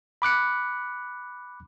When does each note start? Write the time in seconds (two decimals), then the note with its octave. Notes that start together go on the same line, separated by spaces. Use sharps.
0.22 B5 D6 F#6 C#7